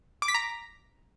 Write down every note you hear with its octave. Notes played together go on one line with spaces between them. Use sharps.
D6
B6
A#5